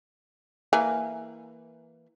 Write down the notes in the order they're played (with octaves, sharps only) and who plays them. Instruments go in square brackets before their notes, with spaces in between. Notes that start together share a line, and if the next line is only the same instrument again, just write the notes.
[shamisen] E3 A#3 G#5